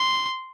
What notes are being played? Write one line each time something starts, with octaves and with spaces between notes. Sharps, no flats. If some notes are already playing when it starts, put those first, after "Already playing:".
Already playing: C6